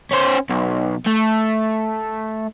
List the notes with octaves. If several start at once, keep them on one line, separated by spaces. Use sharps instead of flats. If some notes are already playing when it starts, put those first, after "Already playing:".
C#4 C5
B1
A3